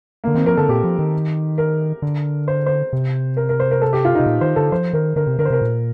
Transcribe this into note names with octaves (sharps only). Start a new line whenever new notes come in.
D3 A#3
D#3 C4
F3 A#4
D3 A4
A#2 G4
F3
D#3
A#4
D3
C5
C5
C3
A#4
A#4
C5
A#4
A4
G4
F4
C3 D#4
A#2
D#3 C5
D3 A4
F3 C5
D#3 A#4
D3 A#4
C3
D3 A#4
C5
C3 A#4
A#2